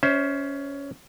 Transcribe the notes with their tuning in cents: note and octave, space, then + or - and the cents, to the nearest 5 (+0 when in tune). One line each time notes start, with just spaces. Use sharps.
C#4 +15 C5 +0 E5 -25